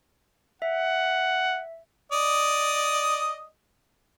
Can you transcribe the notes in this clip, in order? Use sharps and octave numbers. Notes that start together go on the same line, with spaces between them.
E5 F#5
D5 D#5 D#6